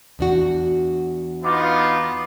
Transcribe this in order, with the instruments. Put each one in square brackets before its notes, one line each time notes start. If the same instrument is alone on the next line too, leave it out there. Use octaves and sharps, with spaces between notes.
[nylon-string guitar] E2 D4 F#4
[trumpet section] B3 D#4 F4 [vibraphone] D6